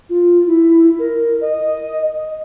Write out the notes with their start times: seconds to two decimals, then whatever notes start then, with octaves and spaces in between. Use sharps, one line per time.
0.10 F4
0.47 E4
0.99 A#4
1.41 D#5